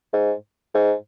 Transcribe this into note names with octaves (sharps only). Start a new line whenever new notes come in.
G#2
G#2